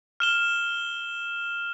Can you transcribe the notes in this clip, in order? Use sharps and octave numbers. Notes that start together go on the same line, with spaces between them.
F6 E7 G7